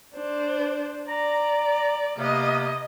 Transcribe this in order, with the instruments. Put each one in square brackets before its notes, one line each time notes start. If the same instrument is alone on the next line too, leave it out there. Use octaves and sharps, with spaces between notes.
[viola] D4 C5
[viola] D5 [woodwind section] A#5
[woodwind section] C3 A#3 B3 [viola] D#5